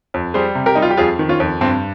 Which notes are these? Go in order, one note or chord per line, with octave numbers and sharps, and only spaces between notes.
F2
G3 G#4 C5
C3
G4 A#4
G3 D#4
F4
G4
F2 F4 G#4
D#3
C#4 F4
F2
G2 C4